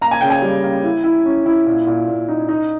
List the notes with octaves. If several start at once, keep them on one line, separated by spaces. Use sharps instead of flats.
A#3 A#5
G#5
C#3 G5
G#5
G3
A#3
E4
E4
C#4
E4
A#2
A#2
A#2
D#4
D#4